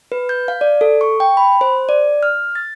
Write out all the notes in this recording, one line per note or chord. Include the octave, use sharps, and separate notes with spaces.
B4
G6
F5
D5
A4
C#6
G5
B5
C5
D5
F6
A6